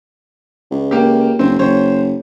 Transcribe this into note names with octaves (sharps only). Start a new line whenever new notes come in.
C#2
A#3 G4
F#1 C4
F#1 C5 C#5